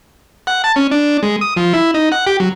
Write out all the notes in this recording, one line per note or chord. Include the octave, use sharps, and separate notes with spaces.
F#5
A5
C#4
D4
G#3
D#6
F3
E4
D#4
F#5
G4
F#3